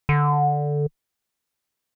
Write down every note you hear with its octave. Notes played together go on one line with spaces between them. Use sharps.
D3